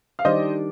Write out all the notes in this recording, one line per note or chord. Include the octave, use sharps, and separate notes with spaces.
F5
D#3 G3 D4 G4 C5 D5 D#5